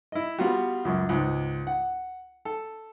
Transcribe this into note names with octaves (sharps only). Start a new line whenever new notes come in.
E4 D#5
G3 B3 F4 F#4
C#2 F#2
C#2 G#2
F#5
A4